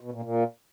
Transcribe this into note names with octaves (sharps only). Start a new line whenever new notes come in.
B2
A#2
A#2